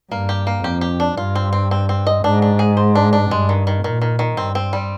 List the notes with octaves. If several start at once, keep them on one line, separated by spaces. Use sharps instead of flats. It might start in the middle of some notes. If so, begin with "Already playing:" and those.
G2 A#3
G4
A#3
F2 G4
G4
D4
G2 F4
C4
C4
C4
C4
D#5
G#2 D4
D4
G#4
C5
D4
D4
G2 G#3
D#3
D#3
A#2 D#3
D#3
D#3
G2 C4
C4
G3